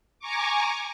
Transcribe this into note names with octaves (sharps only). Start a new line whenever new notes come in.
G#5 A#5 C#6 D6